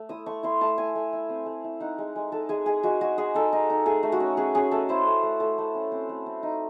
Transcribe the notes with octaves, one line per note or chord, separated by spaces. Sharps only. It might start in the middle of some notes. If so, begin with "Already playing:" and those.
Already playing: A3
E4 D#6
A3 C#6
E4 C6
A3 A5
E4 G#5
A3
E4
C4
A3
E4
D#4 F#5
G#3
G#3
D#4 A4
G#3 G#4
G#3 G#4
G#3 F#4
G#3 F#4
G#3 G#4
D#4 A4
D#4
D#4
A3 G#4
A3
F#4
C#4
C#4 G#4
C#4 G#4
A3 A4
E4 C5
A3
A3
A3 A4
A3
C#4
C4
A3
C4
D#4